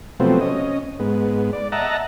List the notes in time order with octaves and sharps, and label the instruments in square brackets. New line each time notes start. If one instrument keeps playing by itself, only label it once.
[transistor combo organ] C3 F3 F#3 A3 B3 C4
C#4 D#5
G#2 B3
D5
D#5 E5 F#5 A5 A#5